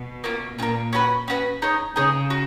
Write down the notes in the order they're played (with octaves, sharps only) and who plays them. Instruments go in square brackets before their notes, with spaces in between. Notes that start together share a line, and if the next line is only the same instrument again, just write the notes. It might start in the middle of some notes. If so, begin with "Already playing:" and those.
Already playing: [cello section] B2
[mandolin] A#3 C#4 F4
[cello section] A#2 [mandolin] C#4 F4
[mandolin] A#3
C#4 F#4 B4
C#4 F#4 B4
D#4 G#4 C#5
[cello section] C#3 [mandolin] D#4 G#4 C#5
[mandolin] F#4